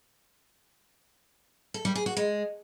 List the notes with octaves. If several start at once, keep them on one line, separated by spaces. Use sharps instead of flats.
A4
G3
G#4
F#4
G#3